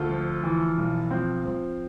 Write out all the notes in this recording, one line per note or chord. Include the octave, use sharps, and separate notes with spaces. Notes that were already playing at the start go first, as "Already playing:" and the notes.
Already playing: D2 F4 A4
F3
E3
B1
F3 C4
F3